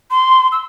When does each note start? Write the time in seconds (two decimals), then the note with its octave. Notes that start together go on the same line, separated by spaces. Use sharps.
0.11 C6
0.52 E6